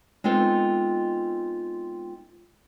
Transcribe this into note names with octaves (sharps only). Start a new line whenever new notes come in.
G#3 B3 C4 D#4 F4 A4